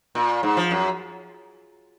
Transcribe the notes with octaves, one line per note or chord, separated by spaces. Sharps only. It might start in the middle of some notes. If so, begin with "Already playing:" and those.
A#2
G#2
F3
F#2